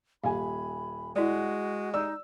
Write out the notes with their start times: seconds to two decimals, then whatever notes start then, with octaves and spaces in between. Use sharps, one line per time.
0.24 D#1 F5 G#5 B5
1.16 G#3 E4 F#4 D5
1.94 D#4 D5 E6